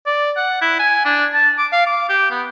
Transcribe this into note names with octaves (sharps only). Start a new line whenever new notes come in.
D5
F#5
E4
G#5
D4
A5
D6
F5
D6
G4
B3